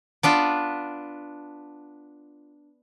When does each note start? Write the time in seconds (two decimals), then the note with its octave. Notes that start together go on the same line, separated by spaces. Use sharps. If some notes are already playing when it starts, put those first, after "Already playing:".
0.23 B3 D4 F4